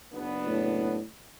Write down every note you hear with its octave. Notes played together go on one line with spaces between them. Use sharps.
F#1 B3 D4
A2